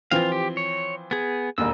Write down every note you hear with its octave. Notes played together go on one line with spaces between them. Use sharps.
E3 F3 C4 F4 F5
G4
C#5
B3 G#4
E1 D#2 E6